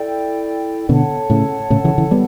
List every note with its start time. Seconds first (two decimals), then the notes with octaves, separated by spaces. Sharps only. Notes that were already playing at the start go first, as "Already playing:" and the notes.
Already playing: E4 A4 D5 G5
0.89 B2 D3 A4 C#5 F#5 A5
1.30 A2 C#3
1.70 A2 C#3
1.84 C#3 E3
1.98 C#3 E3
2.11 G3 B3